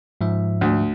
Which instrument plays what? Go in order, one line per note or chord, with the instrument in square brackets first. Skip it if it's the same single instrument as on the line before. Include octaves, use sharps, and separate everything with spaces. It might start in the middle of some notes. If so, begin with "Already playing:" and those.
[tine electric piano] G#2 F3 E5
[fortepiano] D2